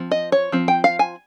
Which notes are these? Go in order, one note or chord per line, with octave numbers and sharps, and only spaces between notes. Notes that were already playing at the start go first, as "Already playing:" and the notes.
Already playing: F3 C4
D#5
C#5
F3 C4
G5
F5
G#5